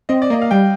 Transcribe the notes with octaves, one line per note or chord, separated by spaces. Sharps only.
C4 D#5
D5
A#3 D#5
F5
G3 G5